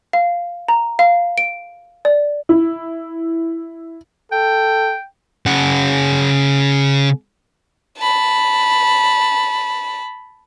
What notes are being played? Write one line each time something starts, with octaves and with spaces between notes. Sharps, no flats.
F5
A#5
F5
D7
D5
E4
A4 G5
C#3 F#5
A5 B5